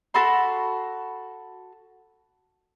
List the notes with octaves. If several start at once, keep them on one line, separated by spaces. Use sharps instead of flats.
F#4 A4 B5 C6